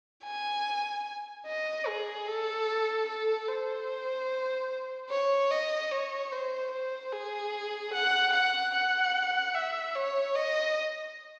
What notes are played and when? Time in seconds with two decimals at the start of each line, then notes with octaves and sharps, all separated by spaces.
0.25 G#5
1.47 D#5
1.87 G#4
2.28 A4
3.08 A4
3.48 C5
5.10 C#5
5.51 D#5
5.91 C#5
6.32 C5
6.71 C5
7.12 G#4
7.94 F#5
8.33 F#5
8.74 F#5
9.55 E5
9.95 C#5
10.35 D#5